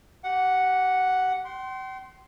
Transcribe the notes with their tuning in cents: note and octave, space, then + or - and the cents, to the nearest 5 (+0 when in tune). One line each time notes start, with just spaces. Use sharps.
G4 -30 F#5 +0
G5 -45 C6 +0